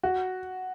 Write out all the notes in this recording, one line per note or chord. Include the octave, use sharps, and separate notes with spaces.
F#4